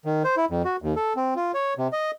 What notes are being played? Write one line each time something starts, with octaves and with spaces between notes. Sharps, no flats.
D#3
C5
E4
F2
F#4
D#2
A4
C4
F4
C#5
C3
D#5